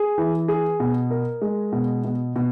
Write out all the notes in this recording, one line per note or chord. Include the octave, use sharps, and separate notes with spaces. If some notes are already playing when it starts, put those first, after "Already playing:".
Already playing: G#4
E3
G#4
B2
A#4
G#3
B2
B2
B2